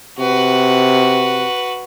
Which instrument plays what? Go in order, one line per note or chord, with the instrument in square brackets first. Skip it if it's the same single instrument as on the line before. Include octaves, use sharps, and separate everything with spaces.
[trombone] C3 [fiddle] F#4 B4